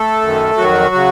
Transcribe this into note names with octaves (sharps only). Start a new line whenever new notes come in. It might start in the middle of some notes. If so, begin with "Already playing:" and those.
Already playing: A3 A4
F#2 D#3
F2 D#3 F#3 F#4
C#3